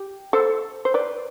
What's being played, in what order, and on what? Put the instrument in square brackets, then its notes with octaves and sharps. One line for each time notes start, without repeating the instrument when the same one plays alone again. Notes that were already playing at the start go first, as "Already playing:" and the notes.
Already playing: [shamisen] G4
A4 C5
C5
B4 D5